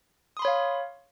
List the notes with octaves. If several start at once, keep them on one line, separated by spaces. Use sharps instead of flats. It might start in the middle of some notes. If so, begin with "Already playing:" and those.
C#5 F5 B5 C6 D#6